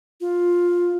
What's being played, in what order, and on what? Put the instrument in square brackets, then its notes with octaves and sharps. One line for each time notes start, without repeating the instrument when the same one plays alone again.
[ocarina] F4